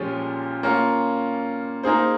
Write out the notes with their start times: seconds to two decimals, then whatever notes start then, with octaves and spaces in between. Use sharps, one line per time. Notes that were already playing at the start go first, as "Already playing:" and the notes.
Already playing: A#2 F3 G#3 C#4 G4
0.63 A#3 C#4 F4
1.83 A#3 D#4 G#4 C5